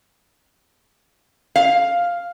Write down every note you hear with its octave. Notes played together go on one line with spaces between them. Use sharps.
F5